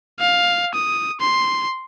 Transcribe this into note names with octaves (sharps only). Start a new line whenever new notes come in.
F5
D#6
C6